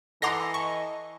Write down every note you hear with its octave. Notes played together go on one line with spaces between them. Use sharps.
E3 A4 D#5 F#5 A#5 C6 D6 A#6
A5 C#6